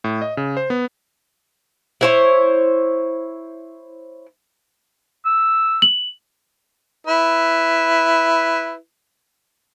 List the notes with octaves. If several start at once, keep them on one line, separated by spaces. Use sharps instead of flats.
A2
D#5
C#3
C5
B3
E4 C5 C#5
E6
F#7
E4 B4